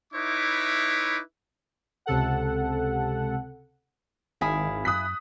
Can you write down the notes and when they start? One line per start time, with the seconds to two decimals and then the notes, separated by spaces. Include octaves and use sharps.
0.13 D#4 E4 B4 C#5 E5 D6
2.06 C#2 C3 A4 F#5
4.41 G#1 D#3 E4 G#4 F5
4.85 F#2 D#6 F#6 B6